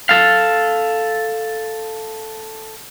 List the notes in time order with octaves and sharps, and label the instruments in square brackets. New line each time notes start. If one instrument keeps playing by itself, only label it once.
[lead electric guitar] A4 F5